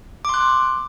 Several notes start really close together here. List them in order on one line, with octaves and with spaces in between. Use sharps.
D6 C6 F#6